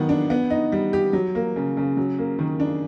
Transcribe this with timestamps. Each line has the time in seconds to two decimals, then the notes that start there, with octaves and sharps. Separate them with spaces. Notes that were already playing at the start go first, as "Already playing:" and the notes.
Already playing: D#3 F#3 B3
0.09 D4
0.30 B3
0.50 D#4
0.72 G3
0.93 G4
1.13 F#3
1.35 A#3
1.56 C#3
1.77 C#3
1.97 F#3
2.18 A#3
2.39 D#3
2.60 D4